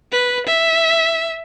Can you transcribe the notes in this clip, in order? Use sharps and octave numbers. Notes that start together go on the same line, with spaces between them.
B4
E5